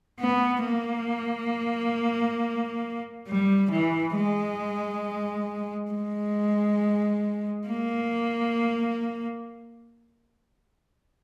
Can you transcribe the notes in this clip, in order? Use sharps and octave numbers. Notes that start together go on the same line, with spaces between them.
B3
A#3
G3
E3
G#3
G#3
A#3